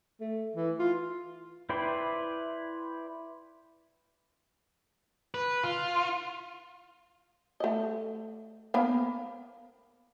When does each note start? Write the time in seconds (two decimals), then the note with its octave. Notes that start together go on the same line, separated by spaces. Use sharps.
0.21 A3
0.56 E3
0.79 F4
1.69 E4 B4 C5 D5 G5
5.34 B4
5.64 F4
7.60 A3 D#5
8.74 A#3 B3 F5